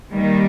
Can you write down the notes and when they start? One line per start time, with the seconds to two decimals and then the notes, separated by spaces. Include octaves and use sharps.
0.12 D#2 D#3 G3